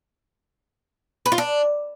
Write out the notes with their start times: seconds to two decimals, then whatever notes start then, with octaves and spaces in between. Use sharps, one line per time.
1.26 B4
1.32 F4
1.38 D4